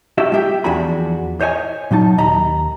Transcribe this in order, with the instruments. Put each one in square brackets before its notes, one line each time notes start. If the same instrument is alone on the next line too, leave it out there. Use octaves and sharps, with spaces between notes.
[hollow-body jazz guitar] F#4 G4 D#5 E5
G#3 F4 G4 E5 G5
E2 F3 D4 F#4 G#4 B5
C5 C#5 D#5 G#5
A#2 F#3 D#4 A5
D#2 D#5 A#5 B5